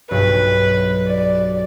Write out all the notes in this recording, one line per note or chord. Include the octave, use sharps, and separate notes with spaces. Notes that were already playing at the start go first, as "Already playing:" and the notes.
B1 G2 B4
D5